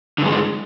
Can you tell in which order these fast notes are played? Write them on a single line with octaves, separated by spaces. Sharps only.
D3 G2 G#3